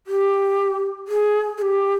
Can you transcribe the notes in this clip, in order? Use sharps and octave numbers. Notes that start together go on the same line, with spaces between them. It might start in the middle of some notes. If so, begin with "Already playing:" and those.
G4
G#4
G#4
G4